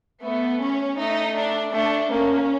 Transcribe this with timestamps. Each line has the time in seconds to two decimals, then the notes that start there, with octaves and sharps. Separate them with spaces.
0.23 A3 B3
0.60 C#4
0.98 A3 D#4
1.35 D4
1.73 A3 D4
2.11 A#3 C#4